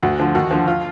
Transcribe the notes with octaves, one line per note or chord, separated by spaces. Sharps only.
D2 F#4
D3 F3
D#2 F#4
D3 F3
F4